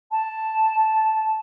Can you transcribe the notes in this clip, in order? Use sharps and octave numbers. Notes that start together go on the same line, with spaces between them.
A5